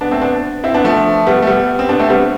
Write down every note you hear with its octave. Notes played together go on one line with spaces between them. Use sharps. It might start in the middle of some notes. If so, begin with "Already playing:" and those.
B3 D4
A3 C4
B3 D4
C4 E4
B3 D4
F3 A3
G3 B3
A3
G3 B3
C4
B3 D4
A3 C4
G3 B3